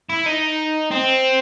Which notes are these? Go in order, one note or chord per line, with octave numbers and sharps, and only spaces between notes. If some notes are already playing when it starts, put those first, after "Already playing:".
E4
D#4
C4